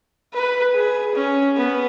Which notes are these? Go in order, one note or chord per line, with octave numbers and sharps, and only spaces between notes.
B4
G#4
C#4
B3